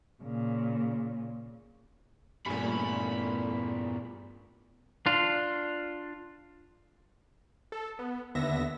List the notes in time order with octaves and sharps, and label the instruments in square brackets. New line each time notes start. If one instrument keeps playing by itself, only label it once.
[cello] A#2 C#3
[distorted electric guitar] E2 C#4 [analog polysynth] G2 A#2 [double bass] A3 [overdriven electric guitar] B5
[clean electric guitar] D4 F4
[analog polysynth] A4
B3
D#2 D3 B3 E5 A#6